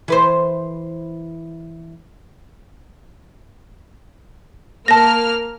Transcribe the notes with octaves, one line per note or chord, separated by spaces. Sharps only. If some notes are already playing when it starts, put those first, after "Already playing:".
E3 B4 C5
A#3 A#4 A5 F6 A#6